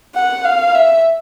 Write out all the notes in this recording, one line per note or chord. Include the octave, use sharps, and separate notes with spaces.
F#5
F5
E5